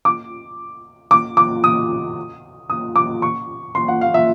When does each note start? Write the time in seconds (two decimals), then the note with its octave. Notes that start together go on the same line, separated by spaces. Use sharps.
0.05 D6
1.11 D6
1.37 D6
1.64 D#6
2.70 D#6
2.96 D6
3.22 C#6
3.75 C6
3.88 F#5
4.01 F5
4.14 E5